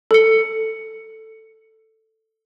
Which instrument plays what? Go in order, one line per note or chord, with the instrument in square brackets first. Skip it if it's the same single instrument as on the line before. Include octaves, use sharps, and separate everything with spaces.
[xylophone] A4 C#7